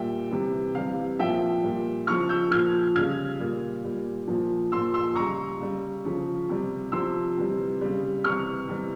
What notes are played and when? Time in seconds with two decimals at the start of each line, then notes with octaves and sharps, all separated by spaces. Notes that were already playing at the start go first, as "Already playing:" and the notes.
Already playing: A#2 G3 E5 G5
0.31 C3 E3 G3
0.75 C3 E3 G3 F5
1.19 A#2 F3 E5 G5
1.63 A#2 G3
2.07 C#3 F3 C#6 F6
2.29 E6 G6
2.51 A#2 F3 F6 G#6
2.96 C#3 G3 F6 G#6
3.40 A#2 G3
3.84 A#2 G3
4.28 A#2 F3
4.72 A#2 F3 C6 E6
4.94 C6 E6
5.16 C#3 G3 A#5 C#6
5.60 C#3 G3
6.05 C#3 F3
6.49 C3 G3
6.92 C3 F3 C6 E6
7.37 C3 E3 G3
7.81 C#3 G3
8.24 C3 E3 G3 C#6 F6
8.69 C3 E3 G3